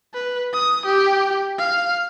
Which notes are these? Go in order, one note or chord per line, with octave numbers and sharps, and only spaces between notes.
B4
D#6
G4
F5